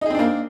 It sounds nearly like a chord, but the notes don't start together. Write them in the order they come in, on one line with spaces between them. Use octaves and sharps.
D#4 G#4 C4 D4 A#3